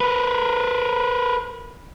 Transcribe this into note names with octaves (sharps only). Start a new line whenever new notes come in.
A#4 B4